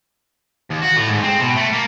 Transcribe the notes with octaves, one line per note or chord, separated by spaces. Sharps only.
D#2
F#4
A2
G#2
C4
B2
A3
A#3